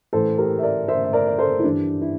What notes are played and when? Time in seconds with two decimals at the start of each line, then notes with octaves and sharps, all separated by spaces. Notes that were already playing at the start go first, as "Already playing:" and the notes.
0.13 A2 E3 A4 C5
0.38 G4 A#4
0.59 E5
0.63 A#4 D5
0.88 C5 E5
1.04 E5
1.13 A#4 D5
1.27 D5
1.39 A4 C5
1.59 E4
1.64 G2 E3 D4
2.01 E4